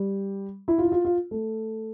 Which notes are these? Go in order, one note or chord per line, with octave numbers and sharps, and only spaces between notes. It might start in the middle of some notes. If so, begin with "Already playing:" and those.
Already playing: G3
E4
F4
E4
F4
F4
A3